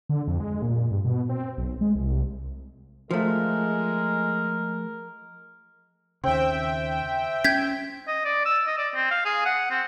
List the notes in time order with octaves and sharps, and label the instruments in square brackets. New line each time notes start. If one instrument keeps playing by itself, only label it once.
[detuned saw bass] D3
F2
G#3
A#2
G2
B2
C4
B1
G#3
C2
[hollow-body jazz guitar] F3 A3 [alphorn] G#3 [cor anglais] A#4
[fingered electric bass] D#2 C#3 [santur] C4 [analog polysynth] E5 G5
[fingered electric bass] C#4 [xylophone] G6 G#6 B6
[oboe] D#5
D5
E6
D#5
D5
C4
F5
G#4
F#5
C4